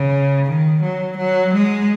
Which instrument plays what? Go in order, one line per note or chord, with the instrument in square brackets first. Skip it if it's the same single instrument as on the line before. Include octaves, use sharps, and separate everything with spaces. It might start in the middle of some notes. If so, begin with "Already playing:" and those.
Already playing: [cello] C#3
D#3
F#3
F#3
G#3